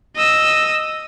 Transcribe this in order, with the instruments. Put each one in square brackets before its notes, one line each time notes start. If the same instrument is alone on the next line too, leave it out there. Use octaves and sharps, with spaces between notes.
[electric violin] D#5 E6